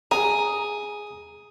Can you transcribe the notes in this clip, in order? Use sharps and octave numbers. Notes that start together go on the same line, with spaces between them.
G#4 A#5